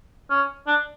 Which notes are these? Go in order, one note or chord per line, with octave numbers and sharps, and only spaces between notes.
C#4
D4